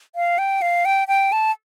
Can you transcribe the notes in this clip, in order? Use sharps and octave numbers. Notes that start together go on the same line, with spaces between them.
F5
G5
F5
G5
G5
A5